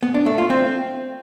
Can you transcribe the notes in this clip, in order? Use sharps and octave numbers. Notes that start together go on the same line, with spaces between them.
B3
D4
A3
F4
C4